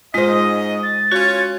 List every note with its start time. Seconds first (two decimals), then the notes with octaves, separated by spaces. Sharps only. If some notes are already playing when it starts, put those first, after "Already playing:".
0.14 G#2 G#3 F4 C5 D#5
0.83 A6
1.12 C#4 F4 F#4 C#5